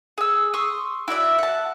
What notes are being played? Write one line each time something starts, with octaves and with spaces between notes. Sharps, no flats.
G#4 E6
C6 C#6 D#6 E6
E4 F#4 D5 E5
F#5 A5